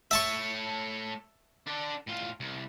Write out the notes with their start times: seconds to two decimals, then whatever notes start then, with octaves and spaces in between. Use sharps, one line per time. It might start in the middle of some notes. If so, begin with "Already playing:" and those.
0.11 A3 C#5 E5 A5 C#6
1.67 D4 A4
2.07 A2 F4
2.40 C2